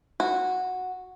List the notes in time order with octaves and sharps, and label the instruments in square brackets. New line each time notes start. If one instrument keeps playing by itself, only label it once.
[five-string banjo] F#4